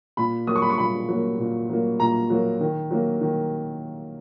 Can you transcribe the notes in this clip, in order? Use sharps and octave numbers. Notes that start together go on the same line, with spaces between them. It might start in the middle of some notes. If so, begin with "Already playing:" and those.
A#2 B5
F#3 A#3 D#6
C#6
B5
C#6
A#2 B5
F#3 A#3
A#2
F#3 A#3
A#2 A#5
F#3 A#3
D#3
F#3 A#3
D#3